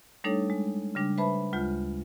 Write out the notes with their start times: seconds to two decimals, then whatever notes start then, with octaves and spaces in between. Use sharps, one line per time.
0.24 G3 A3 D4 D#4 A4 C#5
0.50 G#3
0.95 C#3 G3 D4
1.18 B4 C5 E5 A5 B5
1.53 D2 G#3 F4 G6